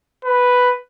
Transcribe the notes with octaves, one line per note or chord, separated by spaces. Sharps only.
B4